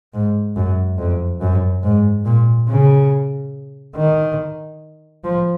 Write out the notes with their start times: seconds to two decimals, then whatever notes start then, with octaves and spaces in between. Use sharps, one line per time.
0.14 G#2
0.56 F#2
0.98 F2
1.41 F#2
1.83 G#2
2.26 A#2
2.69 C#3
3.96 D#3
5.24 F3